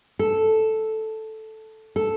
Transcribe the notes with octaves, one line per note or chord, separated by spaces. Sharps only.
A4
A4